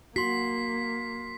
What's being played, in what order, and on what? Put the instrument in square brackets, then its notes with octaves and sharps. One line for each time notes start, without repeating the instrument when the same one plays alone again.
[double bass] A#3 [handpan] F#4 [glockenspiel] C6 C7 [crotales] B6